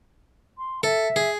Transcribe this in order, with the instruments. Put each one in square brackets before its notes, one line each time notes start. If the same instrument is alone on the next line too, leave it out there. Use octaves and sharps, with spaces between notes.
[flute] C6
[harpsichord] A4 [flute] E5
[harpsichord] G#4